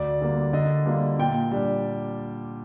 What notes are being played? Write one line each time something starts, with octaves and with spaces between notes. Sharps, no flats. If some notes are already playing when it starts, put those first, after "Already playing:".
Already playing: D2 D5
D3 G3 A#3
D3 D#5
G3 A#3 D4 F4
A#2 G5
G3 D4